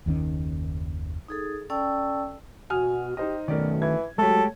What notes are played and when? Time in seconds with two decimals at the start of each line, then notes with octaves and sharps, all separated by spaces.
0.06 F#1 D#2 D#3 C#4
1.28 D#4 G#4 A4
1.70 C#4 A4 D5 G5 A5 E6
2.70 B2 F#4 G#5 D#6 F6
3.17 D#4 G4 C5 D#5
3.48 F#2 B2 D#3 A3 C#4 A#4 D5
3.82 E3 G#6
4.18 F#3 G#3 A3 G4 A4 C#5